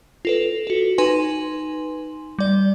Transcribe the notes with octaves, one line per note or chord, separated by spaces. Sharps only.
F4 A4 B4
F#4 A4
D#4 B4 G#5 C6
G3 D5